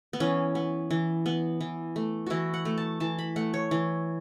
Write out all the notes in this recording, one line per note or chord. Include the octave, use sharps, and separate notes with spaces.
B3
E3 C#4
B3
E3
B3
E3
A3
E3 E4 F#4
F#5
A3
A5
E3 A5
B5
A3 F#5
C#5
E3